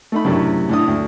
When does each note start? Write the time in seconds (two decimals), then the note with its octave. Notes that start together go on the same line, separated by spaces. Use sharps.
0.12 A3 D#4 B5
0.24 F#2 A2 C3 D4
0.69 A2 D4 D#6
0.88 D2